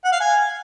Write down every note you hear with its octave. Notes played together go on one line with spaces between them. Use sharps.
F#5
F5
G#5